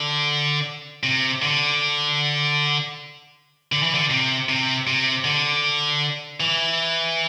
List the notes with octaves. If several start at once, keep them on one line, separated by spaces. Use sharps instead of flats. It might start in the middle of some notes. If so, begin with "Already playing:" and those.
Already playing: D3
C3
D3
D3
E3
D3
C3
C3
C3
D3
E3